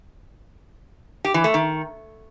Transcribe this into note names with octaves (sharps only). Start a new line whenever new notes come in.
G4
E3
A3
D#3